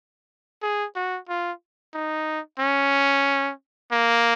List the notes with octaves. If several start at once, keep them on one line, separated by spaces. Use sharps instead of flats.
G#4
F#4
F4
D#4
C#4
A#3